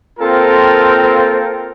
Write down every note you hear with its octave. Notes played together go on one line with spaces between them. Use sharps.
A#3 C4 F4 A4 A#4 G5